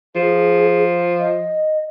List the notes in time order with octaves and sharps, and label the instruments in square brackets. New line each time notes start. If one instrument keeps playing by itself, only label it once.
[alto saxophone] F3 [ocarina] G#4
[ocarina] D#5